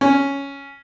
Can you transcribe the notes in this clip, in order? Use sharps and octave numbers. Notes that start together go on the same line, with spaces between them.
C#4